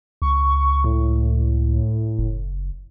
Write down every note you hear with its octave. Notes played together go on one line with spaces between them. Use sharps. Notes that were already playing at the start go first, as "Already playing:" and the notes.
C#2 C#6
A2
F#1